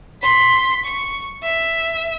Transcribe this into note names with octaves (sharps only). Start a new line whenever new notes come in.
C6 B6
C#6
E5